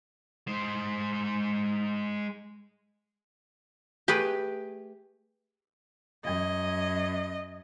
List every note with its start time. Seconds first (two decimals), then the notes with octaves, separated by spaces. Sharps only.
0.47 G#3 C5
4.08 A3 G4 G#4 B4
6.24 F#2 D#5